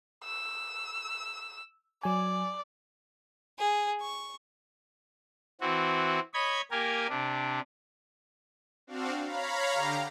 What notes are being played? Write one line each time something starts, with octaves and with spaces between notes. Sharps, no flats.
E6
F#3 D5 G#5
G#4
C#6
E3 C4 F#4
C#5 D#5 B5 G#6
A#3 G4 A#4 G#5
C3 D4
C4 D4 F#4 F5
C#5 F5 A#5 B5
D3 G4 F5 A#5